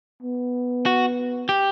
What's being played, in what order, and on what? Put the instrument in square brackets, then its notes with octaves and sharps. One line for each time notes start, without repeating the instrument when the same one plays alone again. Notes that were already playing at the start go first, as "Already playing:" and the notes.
[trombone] B3
[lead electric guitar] F#4
G4